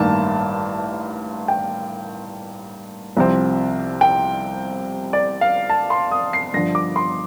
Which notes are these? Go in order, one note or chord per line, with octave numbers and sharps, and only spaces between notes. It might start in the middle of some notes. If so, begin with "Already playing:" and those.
Already playing: A1 G2 D#3 A#3 A5
G5
C2 C3 F3 C4
G5
D5
F5
A5
C6
D#6
C7
G2 D3 F3 A#6
D6
C6